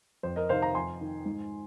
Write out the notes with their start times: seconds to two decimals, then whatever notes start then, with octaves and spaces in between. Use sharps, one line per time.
0.23 F2 C5
0.36 A#4 D#5
0.49 C3 D#3 C5 F5
0.62 F5 A#5
0.75 F2 G#5 C6
1.01 D#3
1.26 G#2